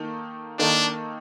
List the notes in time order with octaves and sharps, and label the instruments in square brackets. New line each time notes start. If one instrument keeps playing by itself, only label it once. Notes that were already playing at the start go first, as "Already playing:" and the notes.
Already playing: [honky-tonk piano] D#3 A#3 D#4 A4
[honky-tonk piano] D#3 A#3 D#4 A4 [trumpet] D4